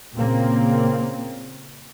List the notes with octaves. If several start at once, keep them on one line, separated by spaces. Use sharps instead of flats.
A#2 C#3 A#3 C4